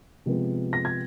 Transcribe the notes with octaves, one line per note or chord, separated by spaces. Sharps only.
C3 F3 G#3 B3
A#6
G#6